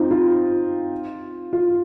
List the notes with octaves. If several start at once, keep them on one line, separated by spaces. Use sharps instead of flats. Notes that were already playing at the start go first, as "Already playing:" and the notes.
Already playing: C4 D#4 F4
F4
F4